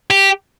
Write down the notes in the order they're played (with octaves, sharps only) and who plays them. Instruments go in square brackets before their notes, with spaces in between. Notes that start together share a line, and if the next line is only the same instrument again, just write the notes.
[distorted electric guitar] G4